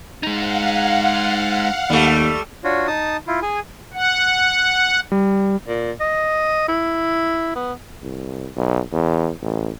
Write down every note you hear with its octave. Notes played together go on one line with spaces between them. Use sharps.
G#3 D#4 F5 F#5
D#2 G3 A3
D4 F4 F#4 C#5
D#4 A5 D#6
E4 F4
G#4 G#5
F#5
G3
A#2
D#5
E4
B3
C2
B1
E2
A1